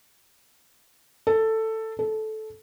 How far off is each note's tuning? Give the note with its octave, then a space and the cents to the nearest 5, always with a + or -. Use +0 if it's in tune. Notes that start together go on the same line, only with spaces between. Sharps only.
A4 +10
A4 -15